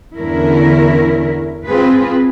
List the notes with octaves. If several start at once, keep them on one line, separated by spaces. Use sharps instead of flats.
E2 D3 C#4 E4 A#4
C4 F4 G#4 B4